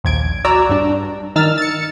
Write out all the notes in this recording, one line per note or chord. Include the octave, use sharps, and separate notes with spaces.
A#1 D#2 G#6 D7
F#4 D5 A#5 E6
G2 D4
D#3 D#4 E6 F6 A6
A6 C#7